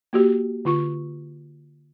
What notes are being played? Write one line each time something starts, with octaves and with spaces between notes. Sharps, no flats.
A#3 F#4 G4
D3 F4 C#6